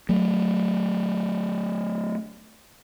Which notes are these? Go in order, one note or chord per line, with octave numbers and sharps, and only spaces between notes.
F#3 A3